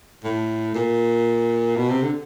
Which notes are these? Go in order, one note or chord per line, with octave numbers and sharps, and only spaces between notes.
A2
A#2
B2
C3
D3